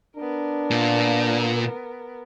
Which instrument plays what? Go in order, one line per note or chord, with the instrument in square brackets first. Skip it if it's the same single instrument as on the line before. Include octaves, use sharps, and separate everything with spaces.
[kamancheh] B3 A#4 [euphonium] D4
[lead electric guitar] A#2